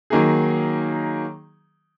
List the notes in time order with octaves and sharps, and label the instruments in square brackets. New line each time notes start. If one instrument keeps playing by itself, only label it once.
[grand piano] D#3 F#3 A#3 D#4 G#4